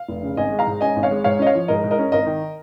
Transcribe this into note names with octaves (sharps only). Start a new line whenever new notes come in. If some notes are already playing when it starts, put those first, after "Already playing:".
Already playing: F5
F1
C#3
G#1 D#5 G#5
G#3
F5 A#5
G#2
C#4 D#5 G#5
G#1
C#5 F5
G#3
G#2 C#5 F5
C#4 D#5
C#5 F5
F3
G#2 A#4 D#5
G#2
A#4 D#5
C#4
G#1 A#4 D#5
D#3